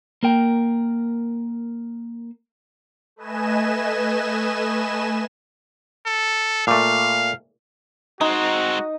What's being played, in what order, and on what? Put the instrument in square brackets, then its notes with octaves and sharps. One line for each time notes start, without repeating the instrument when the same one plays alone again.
[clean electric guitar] A#3 A#4 G5
[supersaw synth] A3 B4 D#5 G#5 E7
[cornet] A4
[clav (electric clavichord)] A#2 A3 [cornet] F5
[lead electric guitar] G#3 C4 [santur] D#4 [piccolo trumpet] F#4